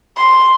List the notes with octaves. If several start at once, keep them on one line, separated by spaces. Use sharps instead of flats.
C6